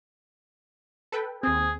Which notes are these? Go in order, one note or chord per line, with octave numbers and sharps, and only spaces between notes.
A4 B4 G5
D#2 C4 G#4